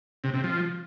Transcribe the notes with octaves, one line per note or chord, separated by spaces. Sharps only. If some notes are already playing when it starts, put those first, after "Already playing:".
C3
C3
F3